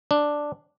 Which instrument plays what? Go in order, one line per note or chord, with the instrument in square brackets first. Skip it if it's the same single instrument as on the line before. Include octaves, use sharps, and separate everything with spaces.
[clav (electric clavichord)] D4